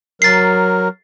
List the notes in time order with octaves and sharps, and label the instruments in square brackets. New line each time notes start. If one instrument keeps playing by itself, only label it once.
[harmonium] F#3 A#4 [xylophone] A6 C7